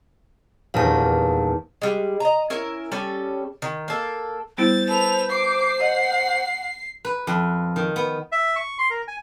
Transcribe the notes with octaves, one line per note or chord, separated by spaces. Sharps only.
D#1 E2 D#4 F5 A5
G3 G#3
D#5 A#5
C#4 E4 A#4
G3 C#4 A4
D#3
A#3 A4
G3 B3 E4 C5 A6
A4 B4 F7
D6 C7
D#5 F#5
B4
F2
D#3
B3
E5
C#6
C6
A#4
G#5